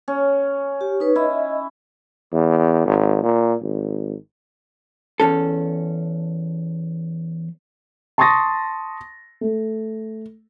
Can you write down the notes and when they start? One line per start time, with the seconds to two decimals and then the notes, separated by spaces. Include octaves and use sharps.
0.08 C#4
0.81 G4
1.00 D#4 B4 C#5
1.16 E4 D#5 E5
2.33 E2
2.86 G#1
3.23 A#2
3.62 G#1
5.20 E2 C#4 A4
8.18 A5 C6 C#6 D#6 A6 A#6
9.41 A3